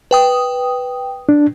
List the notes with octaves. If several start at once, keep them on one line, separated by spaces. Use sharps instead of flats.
B4 G5 D#6
D4